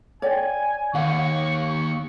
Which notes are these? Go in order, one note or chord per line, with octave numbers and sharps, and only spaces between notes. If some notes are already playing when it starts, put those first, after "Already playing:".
C#5 D5 G5 G#5
D#2 F5 F#5 C#6
C#6